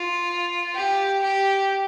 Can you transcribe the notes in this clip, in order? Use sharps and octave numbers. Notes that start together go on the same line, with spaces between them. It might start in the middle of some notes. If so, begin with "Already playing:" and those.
Already playing: F4
G4
G4